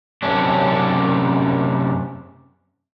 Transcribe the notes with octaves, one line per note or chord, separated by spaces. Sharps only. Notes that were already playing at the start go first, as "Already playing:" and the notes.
F#2 C3 C#4 D4